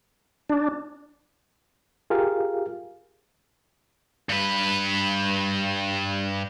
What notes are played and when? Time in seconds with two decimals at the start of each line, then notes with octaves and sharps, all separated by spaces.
0.49 D4
2.10 F4 G4 G#4 A#4 F5
4.29 G2 B4